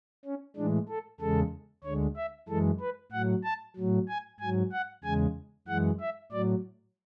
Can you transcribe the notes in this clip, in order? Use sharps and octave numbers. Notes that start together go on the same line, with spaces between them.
C#4
A2 E3 G#3 D4
A4
E2 C#3 G#3 A4
D2 D3 G#3 C#5
E5
F#2 E3 G#3 A4
B4
A2 F#3 F#5
A5
A2 F#3
G#5
G#2 F#3 G#5
F#5
E2 C#3 G#3 G#5
F#2 E3 G#3 F#5
E5
A2 F#3 D5